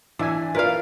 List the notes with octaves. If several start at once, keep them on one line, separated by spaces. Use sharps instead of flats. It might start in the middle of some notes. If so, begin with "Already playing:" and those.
E3 D4 E5 G#5
F4 A#4 B4 D5 F5